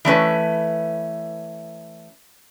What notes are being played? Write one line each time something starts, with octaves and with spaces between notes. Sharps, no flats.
E3 A3 C#4 B4